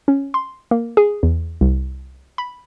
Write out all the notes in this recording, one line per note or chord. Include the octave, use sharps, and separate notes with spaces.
C#4
C6
A#3
G#4
E2
C2
B5